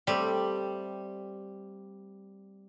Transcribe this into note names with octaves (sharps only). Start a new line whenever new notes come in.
G3 A3 C4 G4